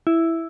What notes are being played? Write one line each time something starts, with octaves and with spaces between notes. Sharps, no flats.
E4